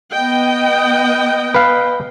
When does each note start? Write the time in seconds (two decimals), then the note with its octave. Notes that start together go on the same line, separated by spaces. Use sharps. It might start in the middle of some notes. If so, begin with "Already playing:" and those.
0.12 B3 D#5 G5
1.54 B4 F5